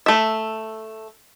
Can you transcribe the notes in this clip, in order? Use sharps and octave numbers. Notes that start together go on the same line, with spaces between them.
A3 E5